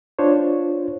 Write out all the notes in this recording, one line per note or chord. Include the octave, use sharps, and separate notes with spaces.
D4 F4 C5 C#5